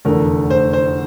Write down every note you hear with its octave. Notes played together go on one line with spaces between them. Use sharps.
F1 E2 D3 A3 A#4
C5
C5